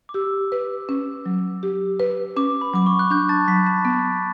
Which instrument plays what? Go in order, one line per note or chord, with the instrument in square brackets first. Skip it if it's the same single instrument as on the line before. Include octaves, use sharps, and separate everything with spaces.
[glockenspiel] D6
[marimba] G4 [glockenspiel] E6
[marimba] B4
C#4
F#3
G4
B4
[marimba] C#4 [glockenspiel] D6
[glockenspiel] B5
[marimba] F#3 [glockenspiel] D6
[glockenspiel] C#6
F#6
[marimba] D4 [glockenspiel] G6
[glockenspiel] A5 A6
[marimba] F#3 [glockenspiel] B5 B6
[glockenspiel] A5 A6
[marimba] B3